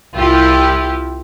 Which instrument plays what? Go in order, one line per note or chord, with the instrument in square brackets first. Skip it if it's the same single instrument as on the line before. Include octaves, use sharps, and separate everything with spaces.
[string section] C2 E4 F4 G4